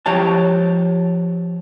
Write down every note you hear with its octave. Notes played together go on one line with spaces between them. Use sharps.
F3 G4 C#5 A5